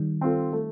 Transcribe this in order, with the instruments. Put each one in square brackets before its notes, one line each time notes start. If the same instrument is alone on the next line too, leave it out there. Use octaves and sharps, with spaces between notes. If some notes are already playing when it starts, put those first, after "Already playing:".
Already playing: [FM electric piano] D#3 G3
[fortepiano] C4 F4 A4
A3